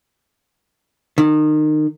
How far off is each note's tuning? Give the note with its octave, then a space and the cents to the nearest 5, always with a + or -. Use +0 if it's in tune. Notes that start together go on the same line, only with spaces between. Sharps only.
D#3 -30